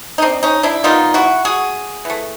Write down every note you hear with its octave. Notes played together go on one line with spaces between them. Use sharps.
D#4
C4 D4
C#4 D#4
D4 E4
D#3 G3 B3 D#4 F4
E4 F#4
F#4 G#4
E3 A3